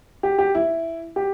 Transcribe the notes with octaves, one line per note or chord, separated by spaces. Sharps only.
G4
G4
E4
G4